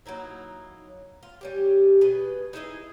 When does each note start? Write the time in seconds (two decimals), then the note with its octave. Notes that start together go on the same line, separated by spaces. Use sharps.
0.06 F#3 A#3 D#4 E4
1.23 F4
1.41 G3 C#4 G4
2.01 B2 G#4 B4 D#5
2.53 D#4 E4 G#4 D#5